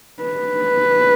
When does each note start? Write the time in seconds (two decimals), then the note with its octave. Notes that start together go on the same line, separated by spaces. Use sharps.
0.23 B4